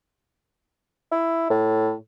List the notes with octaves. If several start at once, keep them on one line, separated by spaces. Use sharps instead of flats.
E4
A2